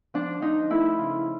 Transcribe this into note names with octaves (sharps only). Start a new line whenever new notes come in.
F3 D4
F3 D#4
A3 E4
C#3 F4